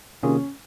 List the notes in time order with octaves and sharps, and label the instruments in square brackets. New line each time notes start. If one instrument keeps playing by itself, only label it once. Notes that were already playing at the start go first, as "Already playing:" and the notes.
[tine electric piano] C3 D#3 A#3 F4 G#4 [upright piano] C#4